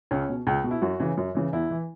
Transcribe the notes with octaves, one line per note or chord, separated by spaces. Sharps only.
C#2 C#4
B2
C#2
B2
E4
F#2 F#4
C#3 E3
F#2
C#3 E3
E2 E4
E3